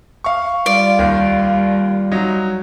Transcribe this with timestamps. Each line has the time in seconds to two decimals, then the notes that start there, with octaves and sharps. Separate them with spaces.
0.24 F5 C#6
0.66 G3 F4 D5
0.99 D#2 D#3
2.12 F#3 D#4